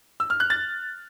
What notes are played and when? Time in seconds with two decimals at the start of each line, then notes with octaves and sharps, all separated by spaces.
0.20 E6
0.30 F6
0.40 F#6
0.50 A6